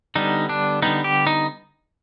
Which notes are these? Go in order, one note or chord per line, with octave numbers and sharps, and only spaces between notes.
D3 G3 B3 D#4
D4
D3 G3 B3 D#4
G4
D#4